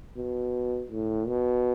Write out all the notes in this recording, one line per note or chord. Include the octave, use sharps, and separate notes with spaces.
B2
A2
B2